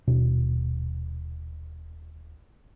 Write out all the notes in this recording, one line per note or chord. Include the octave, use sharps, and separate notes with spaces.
D#1 B2 D4